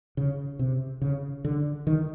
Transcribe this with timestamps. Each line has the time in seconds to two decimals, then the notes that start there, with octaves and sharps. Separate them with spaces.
0.17 C#3
0.59 C3
1.02 C#3
1.44 D3
1.87 D#3